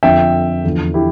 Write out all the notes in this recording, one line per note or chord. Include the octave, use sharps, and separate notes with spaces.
F2 D3 F3 E5 G5
E2 D3 F3
E4 G4